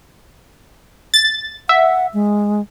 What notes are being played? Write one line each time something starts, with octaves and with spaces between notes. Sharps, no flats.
A6
E5 F#5
G#3